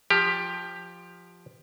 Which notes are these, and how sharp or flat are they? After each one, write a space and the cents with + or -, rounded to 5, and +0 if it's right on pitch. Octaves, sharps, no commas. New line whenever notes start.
F3 +0 G4 +15